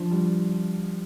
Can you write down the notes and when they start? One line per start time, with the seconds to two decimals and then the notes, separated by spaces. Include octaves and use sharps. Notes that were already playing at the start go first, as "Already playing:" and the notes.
Already playing: F3 D4 F4
0.11 G3